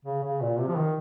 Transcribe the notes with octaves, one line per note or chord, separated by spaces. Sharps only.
C#3
C#3
A#2
C3
F3
D#3